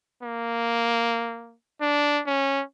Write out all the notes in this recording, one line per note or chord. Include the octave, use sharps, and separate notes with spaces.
A#3
D4
C#4